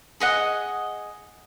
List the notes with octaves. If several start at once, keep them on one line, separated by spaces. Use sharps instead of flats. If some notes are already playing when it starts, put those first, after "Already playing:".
G#4 D#5 F#5